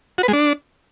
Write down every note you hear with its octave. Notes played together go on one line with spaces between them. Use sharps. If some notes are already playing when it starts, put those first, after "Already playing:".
F#4
B4
G#3
D4